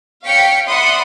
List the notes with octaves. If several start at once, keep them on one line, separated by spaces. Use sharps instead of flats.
C#5 F5 G5 B6 C#7
D5 E5 F#5 B5 C6 D#6